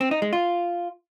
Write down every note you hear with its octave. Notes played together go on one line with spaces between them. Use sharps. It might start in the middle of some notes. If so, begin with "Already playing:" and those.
C4
D#4
G#3
F4